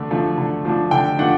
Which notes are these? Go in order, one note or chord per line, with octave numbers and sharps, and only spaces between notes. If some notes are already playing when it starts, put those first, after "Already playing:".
Already playing: D3 A3 D4
F3 A3 D4
D3
F3 A3 D4
D3 G5
F3 A3 D4 F#5